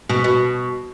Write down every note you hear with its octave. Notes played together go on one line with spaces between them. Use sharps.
B2
B2